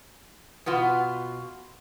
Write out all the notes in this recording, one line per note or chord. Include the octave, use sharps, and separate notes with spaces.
B2 B3 F4